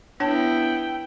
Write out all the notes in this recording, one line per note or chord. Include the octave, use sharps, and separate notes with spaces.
B3 D4 E4 C#5 G5 A5